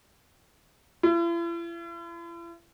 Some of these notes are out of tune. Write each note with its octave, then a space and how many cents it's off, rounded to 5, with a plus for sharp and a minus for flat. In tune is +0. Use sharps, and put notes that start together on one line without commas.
E4 +45